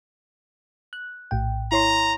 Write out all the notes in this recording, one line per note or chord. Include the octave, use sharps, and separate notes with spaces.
F#6
A#1 A2 G5
E4 C#5 A#5 C6